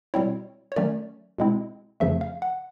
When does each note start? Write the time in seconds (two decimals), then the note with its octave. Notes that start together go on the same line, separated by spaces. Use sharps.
0.14 B2 G3 C4 E4 C#5
0.72 C#5
0.76 D#3 F#3 A3 C#4 D5
1.38 B2 G#3 C4 E4
2.00 F2 C#3 F3 A3 E5
2.21 F5
2.42 F#5